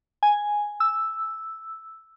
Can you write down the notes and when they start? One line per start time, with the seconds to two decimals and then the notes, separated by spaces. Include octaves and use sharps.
0.23 G#5
0.80 E6